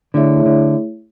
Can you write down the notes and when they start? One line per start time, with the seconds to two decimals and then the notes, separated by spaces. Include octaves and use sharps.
0.14 D3 A3 E4 G#4 C#5 E5
0.46 D3